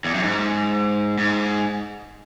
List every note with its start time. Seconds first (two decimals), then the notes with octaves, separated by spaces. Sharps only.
0.05 E2
0.14 F#2
0.23 G#2
1.18 G#2